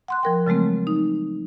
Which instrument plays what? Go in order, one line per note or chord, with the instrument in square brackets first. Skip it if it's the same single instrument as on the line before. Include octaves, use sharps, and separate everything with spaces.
[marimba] F#5 C6 F#6
F3 A#4 G5
C#3 F#3 G#3 A3 C4
D#4